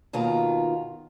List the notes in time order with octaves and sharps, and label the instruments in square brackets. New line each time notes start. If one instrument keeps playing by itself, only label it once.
[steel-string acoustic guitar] D#2 B2 D#3 F4 A#5